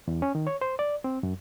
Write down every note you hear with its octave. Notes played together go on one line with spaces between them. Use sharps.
E2
C#4
D#3
C#5
C5
D5
C4
F#2